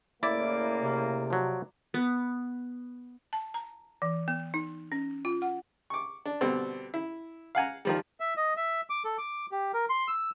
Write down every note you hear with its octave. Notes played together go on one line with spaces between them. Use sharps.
A2 C#3 A#3 E4 D5
C3
F3 F#3
B3
A5
A#5
E3
B3
D#4
C#4
F4
F#5
C#6 D6
D4
B2 D3 G3 C4
E4
F5 F#5 G#5 A#5
D#3 F3 G3
E5
D#5
E5
D6
A4
D6
G4
A#4
C6
E6